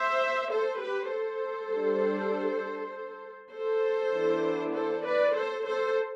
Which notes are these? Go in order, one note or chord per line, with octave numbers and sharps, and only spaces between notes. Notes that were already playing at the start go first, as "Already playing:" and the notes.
Already playing: C5 E5
A4 C5
G4 B4
A4 C5
G3 D4
A4 C5
E3 B3 D4
A4 C5
B4 D5
A4 C5
A4 C5